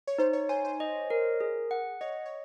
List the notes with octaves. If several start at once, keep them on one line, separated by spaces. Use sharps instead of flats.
C#5
D#4 C5
C#5
C5 G#5
C5
D#5
A#4
G#4
F#5
C#5 D#5
C#5